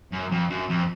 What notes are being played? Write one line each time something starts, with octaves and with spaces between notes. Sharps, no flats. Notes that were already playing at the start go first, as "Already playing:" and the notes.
F#2
F2
F#2
F2